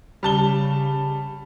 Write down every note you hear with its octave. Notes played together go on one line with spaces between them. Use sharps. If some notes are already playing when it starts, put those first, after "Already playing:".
C#3 G3 A5 G7